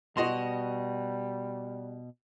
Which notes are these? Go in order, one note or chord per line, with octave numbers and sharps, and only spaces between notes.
B2 G3 F#4 D#5 C6